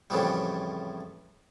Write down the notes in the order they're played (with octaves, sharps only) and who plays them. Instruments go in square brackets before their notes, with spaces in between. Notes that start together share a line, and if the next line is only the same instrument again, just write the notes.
[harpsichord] F2 A2 C#3 E3 F3 G3